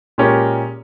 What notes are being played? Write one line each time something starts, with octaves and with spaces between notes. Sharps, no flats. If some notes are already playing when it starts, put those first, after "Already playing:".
A#2 G#3 C#4 G4 A#4